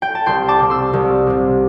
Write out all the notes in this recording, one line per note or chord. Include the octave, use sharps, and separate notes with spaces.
G5
A5
C2 G5 C6
A5 D6
C3 G3 C4
C6 E6
C2
C3 G3 C4